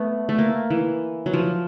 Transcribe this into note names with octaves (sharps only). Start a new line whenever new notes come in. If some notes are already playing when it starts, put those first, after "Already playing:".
Already playing: A3 B3
A3
A#3
E3
F#3
F3